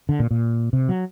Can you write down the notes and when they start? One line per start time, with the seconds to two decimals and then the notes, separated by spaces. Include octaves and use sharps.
0.09 D3
0.20 A#2
0.31 A#2
0.73 C3
0.89 F#3